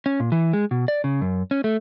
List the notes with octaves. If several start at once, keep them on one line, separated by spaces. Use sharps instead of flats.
C#4
A#2
E3
G#3
B2
D5
C#3
F#2
C#4
A3